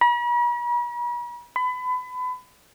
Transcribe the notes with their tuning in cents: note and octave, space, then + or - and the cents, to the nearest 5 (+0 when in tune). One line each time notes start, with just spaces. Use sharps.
B5 -45
B5 +30